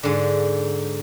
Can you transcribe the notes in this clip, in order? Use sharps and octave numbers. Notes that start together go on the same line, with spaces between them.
G#2 D3